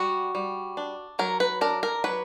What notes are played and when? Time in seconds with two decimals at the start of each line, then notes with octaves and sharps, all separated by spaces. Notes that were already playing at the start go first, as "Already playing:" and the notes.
Already playing: G3 F#4
0.35 G3
0.77 D4
1.19 F#3 A#4
1.40 B4
1.61 D4 A#4
1.83 A#4
2.04 F#3 B4